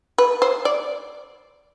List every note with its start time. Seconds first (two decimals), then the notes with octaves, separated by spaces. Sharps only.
0.18 B4
0.42 C5
0.65 D5